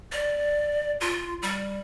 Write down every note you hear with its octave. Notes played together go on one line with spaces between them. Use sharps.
D5
F4
G3